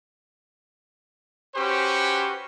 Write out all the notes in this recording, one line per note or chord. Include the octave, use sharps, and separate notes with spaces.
C#4 F#4 G4 B4 C5 C#6